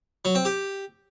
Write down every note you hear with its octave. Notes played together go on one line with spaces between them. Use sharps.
F#3
C4
G4